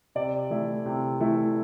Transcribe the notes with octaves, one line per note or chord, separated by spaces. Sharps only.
C3 D5
E3 A3 E4
C3
E3 A3 E4